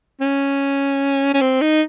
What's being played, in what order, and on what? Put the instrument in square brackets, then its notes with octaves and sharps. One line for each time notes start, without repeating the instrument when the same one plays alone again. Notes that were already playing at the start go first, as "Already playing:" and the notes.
[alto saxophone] C#4
C#4
C4
D#4